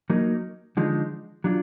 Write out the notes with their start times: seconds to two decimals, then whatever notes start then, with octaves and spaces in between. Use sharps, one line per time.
0.10 F#3 A#3 D#4
0.77 D3 F3 G#3 D#4
1.44 F#3 D4 F4